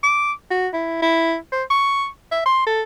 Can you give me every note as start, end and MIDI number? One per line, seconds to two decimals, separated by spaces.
0.03 0.32 86
0.51 0.68 66
0.74 0.98 64
1.02 1.36 64
1.52 1.64 72
1.70 2.07 85
2.32 2.43 76
2.46 2.63 84
2.67 2.82 69